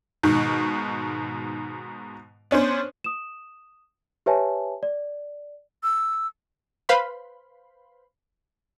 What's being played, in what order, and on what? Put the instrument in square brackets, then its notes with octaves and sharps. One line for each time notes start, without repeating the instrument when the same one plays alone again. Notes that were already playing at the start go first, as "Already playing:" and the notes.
[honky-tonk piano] G#2 B2 D#3
B3 C#4 D4 C5
[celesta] D#6 E7
G4 B4 C#5 E5 G#5 A5
D5
[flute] E6
[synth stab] B4 C5 F5 B5 C6